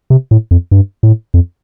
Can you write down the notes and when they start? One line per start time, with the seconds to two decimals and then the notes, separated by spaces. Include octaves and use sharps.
0.10 C3
0.31 A2
0.51 F2
0.71 G2
1.03 A2
1.34 F2